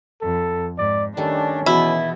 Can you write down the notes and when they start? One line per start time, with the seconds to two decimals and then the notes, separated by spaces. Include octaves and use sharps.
0.22 F2 A4
0.78 G#2 D5
1.17 D#3 G3 A3 C#4 D4
1.66 B2 E3 E4 G#4